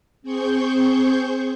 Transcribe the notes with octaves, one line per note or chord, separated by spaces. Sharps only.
C4 G#4 C5 C#6 G6